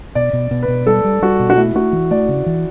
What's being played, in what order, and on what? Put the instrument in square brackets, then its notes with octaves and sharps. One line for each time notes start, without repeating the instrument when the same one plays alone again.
[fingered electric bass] B2 [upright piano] D5
[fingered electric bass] B2
B2
[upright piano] B4
[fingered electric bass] B2
[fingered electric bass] G3 [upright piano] A4
[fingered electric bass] G3
[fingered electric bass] G3 [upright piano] F#4
[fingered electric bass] B2
[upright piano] F#4
[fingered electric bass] A3 [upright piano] E4
[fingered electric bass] A3 [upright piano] F#4
[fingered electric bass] E3
[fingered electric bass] A3 [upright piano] D5
[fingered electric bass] C#3
E3